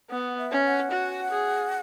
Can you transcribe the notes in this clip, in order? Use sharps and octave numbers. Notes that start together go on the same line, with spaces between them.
B3 F#5
E5
C#4
F#5
F#4
G#4